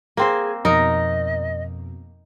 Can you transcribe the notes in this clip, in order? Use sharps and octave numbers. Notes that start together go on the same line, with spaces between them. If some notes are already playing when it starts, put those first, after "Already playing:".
A#3 C4 G#4 C5
F2 B2 D#4 A#4 D#5